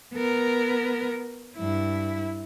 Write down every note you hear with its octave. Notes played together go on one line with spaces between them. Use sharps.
B3 A#4
G2 E4